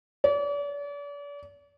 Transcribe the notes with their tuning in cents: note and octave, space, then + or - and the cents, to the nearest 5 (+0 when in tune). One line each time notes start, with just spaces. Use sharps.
D5 -40